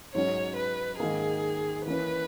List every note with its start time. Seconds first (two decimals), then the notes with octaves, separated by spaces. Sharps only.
0.14 G#2 F#3 C#4 C#5
0.57 B4
0.99 G#2 D#3 A#3 G#4
1.86 E3 A#3 C#4 B4